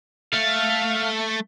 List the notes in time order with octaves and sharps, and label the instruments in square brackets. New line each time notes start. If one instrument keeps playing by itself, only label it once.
[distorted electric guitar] A3 [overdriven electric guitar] F5